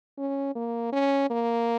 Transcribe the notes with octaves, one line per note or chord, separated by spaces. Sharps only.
C#4
A#3
C#4
A#3